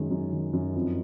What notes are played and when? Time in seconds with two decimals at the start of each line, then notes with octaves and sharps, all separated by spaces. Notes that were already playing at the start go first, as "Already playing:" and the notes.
Already playing: F#2 D#3 G#3
0.11 F#2
0.32 D#3
0.53 F#2
0.75 F2